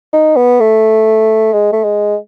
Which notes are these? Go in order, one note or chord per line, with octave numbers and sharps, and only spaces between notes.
D#4
B3
A3
G#3
A3
G#3